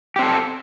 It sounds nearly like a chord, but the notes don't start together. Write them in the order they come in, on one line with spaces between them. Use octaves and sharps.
G4 C4 A4